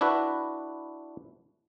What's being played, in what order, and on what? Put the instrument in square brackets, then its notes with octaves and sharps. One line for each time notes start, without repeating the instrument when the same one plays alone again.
[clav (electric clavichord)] D4 E4 F#4 B4